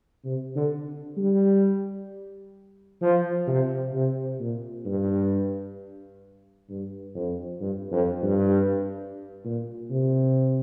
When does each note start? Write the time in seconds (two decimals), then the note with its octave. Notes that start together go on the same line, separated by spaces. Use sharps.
0.25 C3
0.56 D3
1.17 G3
3.01 F3
3.47 C3
3.93 C3
4.39 A#2
4.85 G2
6.69 G2
7.15 F2
7.61 G2
7.92 F2
8.22 G2
9.45 A#2
9.90 C3